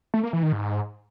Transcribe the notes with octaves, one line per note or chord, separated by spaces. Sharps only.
A3
A#3
E3
D#3
G#2